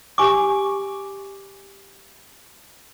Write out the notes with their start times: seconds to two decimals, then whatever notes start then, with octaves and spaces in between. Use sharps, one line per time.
0.18 G4 G#5 C#6 D6